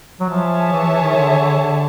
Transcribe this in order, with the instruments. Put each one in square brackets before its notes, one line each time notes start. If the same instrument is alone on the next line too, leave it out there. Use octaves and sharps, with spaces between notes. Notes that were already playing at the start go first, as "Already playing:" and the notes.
[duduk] F#3
[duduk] F3 [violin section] G#4 C#5 E5 A5
[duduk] E3
E3
D#3
D3
D3
D3